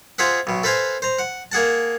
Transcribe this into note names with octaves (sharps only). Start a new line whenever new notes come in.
F4 G#4 C5 E5 F#5
B1 B2
A4 B4 C5 F5 G#5
C5 A#5
F#5
A#3 G#4 F#5 A5